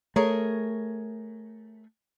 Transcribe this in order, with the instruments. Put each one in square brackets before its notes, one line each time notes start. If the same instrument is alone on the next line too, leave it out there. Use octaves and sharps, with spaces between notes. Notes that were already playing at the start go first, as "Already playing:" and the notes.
[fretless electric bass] A3 [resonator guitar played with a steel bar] G#4 A#4 C#5